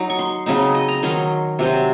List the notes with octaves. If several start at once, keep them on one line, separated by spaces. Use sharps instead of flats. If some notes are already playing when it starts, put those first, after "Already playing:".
Already playing: F#3 D#4
C#6
C6
C#3 F#3 C4 D#4
D#5
A#5
D#3 F#3 C#4 C6
C6
C3 F#3 C4